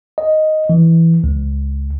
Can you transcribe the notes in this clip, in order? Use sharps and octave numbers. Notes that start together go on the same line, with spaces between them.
D#5
E3
C#2